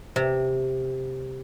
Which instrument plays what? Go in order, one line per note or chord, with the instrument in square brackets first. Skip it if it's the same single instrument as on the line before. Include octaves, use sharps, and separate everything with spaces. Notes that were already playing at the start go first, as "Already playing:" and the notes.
[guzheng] C3